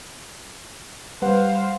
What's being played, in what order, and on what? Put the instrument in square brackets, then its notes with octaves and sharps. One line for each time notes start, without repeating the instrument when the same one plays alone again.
[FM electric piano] G3 B4 F#5 [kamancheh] C5 F5